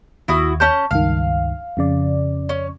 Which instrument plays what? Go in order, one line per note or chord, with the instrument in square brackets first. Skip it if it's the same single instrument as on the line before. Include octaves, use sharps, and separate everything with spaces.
[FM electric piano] D#2 [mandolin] E4 F#4 D#6
[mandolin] C#4 A5 G6
[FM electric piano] C#2 G2 D#3 [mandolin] F5
[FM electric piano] F2 C#3 D5
[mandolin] C#4